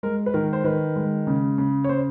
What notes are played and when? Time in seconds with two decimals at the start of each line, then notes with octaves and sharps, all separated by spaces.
0.03 G#3 A#4
0.26 B4
0.34 D#3 A#4
0.53 C5
0.64 D#3 B4
0.96 G#3
1.27 C#3
1.58 C#3
1.84 C#5
1.89 C#3 C5